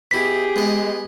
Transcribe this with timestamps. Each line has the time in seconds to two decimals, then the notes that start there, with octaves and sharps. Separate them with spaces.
0.11 B2 E4 G4 G#4 B6
0.56 G#3 B3 D#5